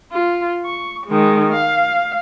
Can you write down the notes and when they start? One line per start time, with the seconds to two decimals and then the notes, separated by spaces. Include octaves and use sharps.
0.12 F4
0.65 C#6
1.07 D#3 G#3
1.53 F5